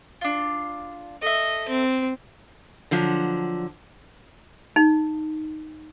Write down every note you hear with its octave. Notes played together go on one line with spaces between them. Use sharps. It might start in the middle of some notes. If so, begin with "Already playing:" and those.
D4 F4
A4 D#5 E5
C4
D3 F3 F#3
D#4